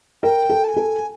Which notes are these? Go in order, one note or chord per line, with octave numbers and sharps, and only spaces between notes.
A#4 G5
A4
A5
G#5
A4